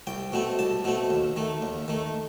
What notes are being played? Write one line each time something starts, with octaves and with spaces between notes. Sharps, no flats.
C2 G5
B2 A3 C4
C2 A5
B2 A3 C4
D#2
D#3 A3
D#2
D#3 A3